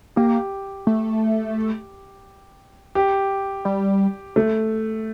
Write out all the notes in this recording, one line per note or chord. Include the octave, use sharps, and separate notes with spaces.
A#3 G4
A3
G4
G3
A3